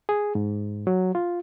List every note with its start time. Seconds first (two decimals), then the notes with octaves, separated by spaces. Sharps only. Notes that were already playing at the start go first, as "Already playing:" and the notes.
0.09 G#4
0.35 G#2
0.87 F#3
1.15 F4